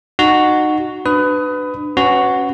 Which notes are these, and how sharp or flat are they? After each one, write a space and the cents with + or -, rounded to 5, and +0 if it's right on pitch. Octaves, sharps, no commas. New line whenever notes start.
D#4 -25 F#4 +0
D4 +25 B4 +20 D#6 +15
C#4 +0 F#4 +0 B4 +20